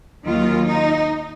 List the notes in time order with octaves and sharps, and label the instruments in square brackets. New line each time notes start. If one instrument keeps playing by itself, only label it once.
[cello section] D#2 D#3 F#3 F4
D#4